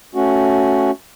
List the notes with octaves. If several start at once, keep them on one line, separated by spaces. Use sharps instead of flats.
A3 C#4 F#4